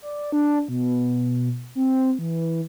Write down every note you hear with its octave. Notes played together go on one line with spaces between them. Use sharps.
D5
D4
B2
C4
E3